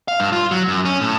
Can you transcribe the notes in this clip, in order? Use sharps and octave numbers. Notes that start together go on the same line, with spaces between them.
F5
G2
F4
F#3
F#2
C#4
A2